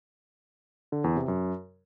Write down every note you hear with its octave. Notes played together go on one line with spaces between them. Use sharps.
D3
E2
C3
F#2